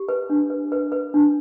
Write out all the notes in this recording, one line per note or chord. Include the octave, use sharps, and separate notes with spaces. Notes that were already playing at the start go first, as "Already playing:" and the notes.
Already playing: G4
B4
D4
B4
B4
B4
D4